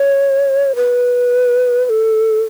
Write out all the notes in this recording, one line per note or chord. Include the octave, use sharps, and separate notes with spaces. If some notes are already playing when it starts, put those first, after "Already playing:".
Already playing: C#5
B4
B4
A4